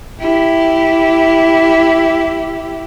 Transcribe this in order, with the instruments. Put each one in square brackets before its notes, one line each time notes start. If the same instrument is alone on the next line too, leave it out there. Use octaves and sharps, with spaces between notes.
[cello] E4 G4